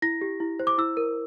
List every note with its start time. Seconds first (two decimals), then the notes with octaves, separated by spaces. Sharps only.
0.02 E4 A#6
0.21 G4
0.40 E4
0.60 C5
0.67 D6
0.78 E4 E6
0.97 A#4